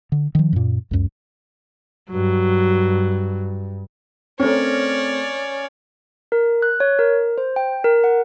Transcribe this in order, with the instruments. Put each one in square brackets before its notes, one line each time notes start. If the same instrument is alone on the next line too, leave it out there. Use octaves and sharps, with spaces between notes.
[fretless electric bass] D3
D#3 F3
F#2 A#2
C#2 F#2
[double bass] G2 [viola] F#3
[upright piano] A3 C4 [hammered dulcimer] C#4 A#4 [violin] C#5 D5
[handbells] A#4
F#6
C#5
A#4
C5
G5
A#4
F#5